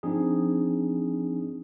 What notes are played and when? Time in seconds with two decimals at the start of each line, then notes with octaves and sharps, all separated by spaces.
0.03 F3 C4 D4 D#4 G#4